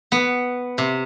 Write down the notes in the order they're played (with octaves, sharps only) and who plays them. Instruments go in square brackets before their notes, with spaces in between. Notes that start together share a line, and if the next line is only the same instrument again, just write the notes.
[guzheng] B3
C3